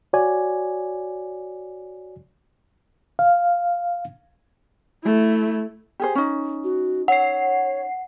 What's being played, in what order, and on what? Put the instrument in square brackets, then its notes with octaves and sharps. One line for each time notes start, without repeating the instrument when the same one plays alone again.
[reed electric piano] F#4 C#5 D5 G#5
F5
[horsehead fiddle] A3 E4
[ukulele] G4 G#4 C5
C#4 D#4
[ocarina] F#4
[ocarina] C#5 [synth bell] F#5 C7